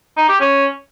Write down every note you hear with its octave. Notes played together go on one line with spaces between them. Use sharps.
D#4
G4
C#4